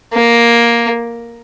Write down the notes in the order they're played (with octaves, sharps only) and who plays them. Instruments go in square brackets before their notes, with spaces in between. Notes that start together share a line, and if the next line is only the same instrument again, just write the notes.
[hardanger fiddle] A#3